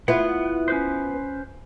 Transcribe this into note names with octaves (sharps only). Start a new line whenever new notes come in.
B3 E4 F4 F#5
C#4 B4 C5